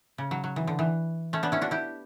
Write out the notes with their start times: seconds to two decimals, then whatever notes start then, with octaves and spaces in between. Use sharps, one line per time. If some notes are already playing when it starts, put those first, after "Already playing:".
0.18 C#3
0.31 F#3
0.44 F#3
0.56 E3
0.67 D3
0.79 E3
1.33 A3 C#4
1.43 B3 D4
1.52 C#4 E4
1.61 D4 F#4
1.71 E4 G4